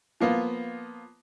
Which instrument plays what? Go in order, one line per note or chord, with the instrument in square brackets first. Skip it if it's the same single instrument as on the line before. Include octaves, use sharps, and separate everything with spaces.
[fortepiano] F3 A#3 B3 F4